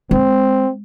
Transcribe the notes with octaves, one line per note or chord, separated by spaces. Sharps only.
G#3 C4